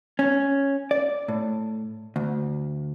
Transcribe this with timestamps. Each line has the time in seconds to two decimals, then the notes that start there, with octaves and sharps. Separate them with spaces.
0.19 C#4
0.91 D5
1.28 A2
2.16 D2